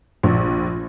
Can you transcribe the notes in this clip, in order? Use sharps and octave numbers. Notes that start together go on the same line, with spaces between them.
A#1